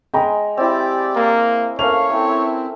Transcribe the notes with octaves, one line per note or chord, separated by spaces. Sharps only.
G#3 G5 G#5 A#5 B5
C4 E4 G4 D5
A#3
A3 A#3 C#4 C#5 F5 F7
A3 C4 E4